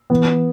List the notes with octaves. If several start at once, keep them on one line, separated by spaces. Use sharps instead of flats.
E3 B3